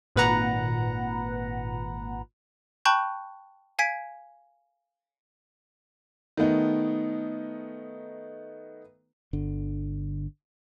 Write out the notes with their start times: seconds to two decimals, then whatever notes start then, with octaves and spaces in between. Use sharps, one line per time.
0.16 G#1 A#2 B4 F#5 A#5
2.85 G5 A5 B5 C#6 F#6 G6
3.79 F5 G#5 G#6 B6 D7
6.37 D#3 A3 B3 D#4
9.33 G1 D3